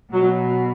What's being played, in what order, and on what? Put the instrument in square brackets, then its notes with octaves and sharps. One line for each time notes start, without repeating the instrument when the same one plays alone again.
[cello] B2 [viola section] F#3